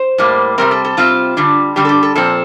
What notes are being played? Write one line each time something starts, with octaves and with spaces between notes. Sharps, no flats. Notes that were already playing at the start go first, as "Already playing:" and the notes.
Already playing: C5
A2 G3 A#3
C3 G3 C4 A#4
A4
A4
C3 G3 C4 F4
D3 G3 D4
D3 G3 D4 G4
A4
G4
A4
A#2 F3 C4 A4